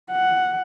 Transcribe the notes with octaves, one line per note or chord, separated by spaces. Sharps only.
F#5